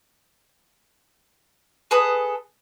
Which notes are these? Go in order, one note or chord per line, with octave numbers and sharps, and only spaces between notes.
G#4 A4 B4 D#6